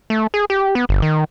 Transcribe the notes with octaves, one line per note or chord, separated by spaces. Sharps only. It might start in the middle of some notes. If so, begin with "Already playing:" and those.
A3
G#4
G4
B3
G1
D#3